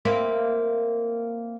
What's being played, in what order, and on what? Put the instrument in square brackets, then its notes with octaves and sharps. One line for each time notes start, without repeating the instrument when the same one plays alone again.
[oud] A#3 C4 E4